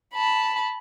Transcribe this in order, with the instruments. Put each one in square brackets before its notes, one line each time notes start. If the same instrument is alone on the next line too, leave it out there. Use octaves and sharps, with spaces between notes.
[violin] A5 B5